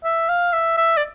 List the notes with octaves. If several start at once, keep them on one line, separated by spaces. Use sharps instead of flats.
E5
F5
E5
E5
D5